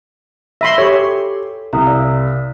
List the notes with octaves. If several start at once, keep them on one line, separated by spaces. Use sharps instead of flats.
E5 B5 C6 A#6 D#7
G4 A4 C#5
C2 A#5 D#6
D5 F5 E6